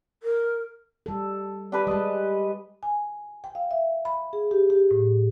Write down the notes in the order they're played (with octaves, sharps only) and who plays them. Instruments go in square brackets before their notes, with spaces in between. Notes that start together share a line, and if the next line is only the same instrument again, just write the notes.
[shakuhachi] A#4
[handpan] G3 A4
[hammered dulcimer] D4 G4 B4
[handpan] G3 G#3 [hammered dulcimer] D#5 A5
[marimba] G#5
G5
F5
E5
B5
G#4
G4
G4
A2